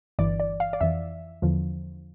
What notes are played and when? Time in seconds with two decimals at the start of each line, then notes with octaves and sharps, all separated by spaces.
0.19 G1 G2 E3 D5
0.40 D5
0.60 F5
0.73 D5
0.81 F2 E3 E5
1.42 E2 D3 F3